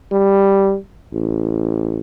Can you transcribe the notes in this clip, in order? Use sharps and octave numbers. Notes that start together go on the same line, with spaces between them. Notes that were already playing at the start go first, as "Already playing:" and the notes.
G3
A1